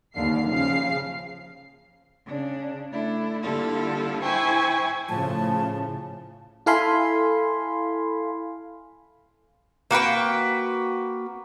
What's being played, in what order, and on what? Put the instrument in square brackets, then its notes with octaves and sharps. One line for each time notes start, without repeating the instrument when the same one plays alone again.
[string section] D#2 D3 F5 C7
C#3 F3 F5 C7
[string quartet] C#3 D4
A3 D4 E4
D3 G3 A#3 E4 F4 A4
E4 C5 G5 G#5 C#6
[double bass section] A2 C#3 [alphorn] F3 [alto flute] A5
[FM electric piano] E4 A4 F5 G#5 B5 C6
[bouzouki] A#3 F#4 B4 G5